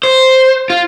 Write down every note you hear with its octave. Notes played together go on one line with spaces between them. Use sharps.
C5
F4